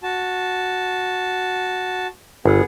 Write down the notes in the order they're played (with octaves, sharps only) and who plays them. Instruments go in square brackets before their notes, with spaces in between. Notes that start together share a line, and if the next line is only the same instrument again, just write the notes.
[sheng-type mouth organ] F#4 A5
[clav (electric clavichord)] G1 [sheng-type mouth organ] B3 G#4